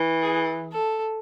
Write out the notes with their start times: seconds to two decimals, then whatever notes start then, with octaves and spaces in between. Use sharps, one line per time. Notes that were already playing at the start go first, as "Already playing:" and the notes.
Already playing: E3
0.22 G#4
0.72 A4